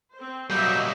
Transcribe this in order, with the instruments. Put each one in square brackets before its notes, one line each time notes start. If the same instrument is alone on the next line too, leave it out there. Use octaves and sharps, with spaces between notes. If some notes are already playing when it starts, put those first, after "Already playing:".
[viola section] C4 C5
[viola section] F#3 D#5 E5 [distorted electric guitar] G3 A#3 [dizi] G6